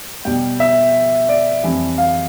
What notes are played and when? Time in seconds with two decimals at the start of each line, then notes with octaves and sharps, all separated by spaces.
0.25 B2 G3 G5
0.60 E5
1.29 D5
1.63 F2 E3 G3
1.98 F5